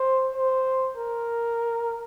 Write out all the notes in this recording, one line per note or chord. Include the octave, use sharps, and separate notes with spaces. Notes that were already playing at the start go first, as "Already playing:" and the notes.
Already playing: C5
C5
A#4